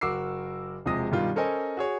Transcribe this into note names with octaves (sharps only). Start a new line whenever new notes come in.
F#1 F#4 A#4 D6 E6 C7
E1 C3 F3 G#3 D#6 A#6
G2 B2 D#3 G3 F4
C#4 A4 A#4 C5 D#5 G#5
F#4 G#4 C#5